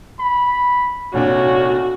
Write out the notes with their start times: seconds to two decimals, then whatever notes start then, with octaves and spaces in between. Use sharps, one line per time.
0.19 B5
1.14 F1 A#2 D4 F#4 C#5